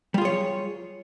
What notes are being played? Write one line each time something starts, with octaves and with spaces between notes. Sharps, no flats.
G3 F4 G#4 C#5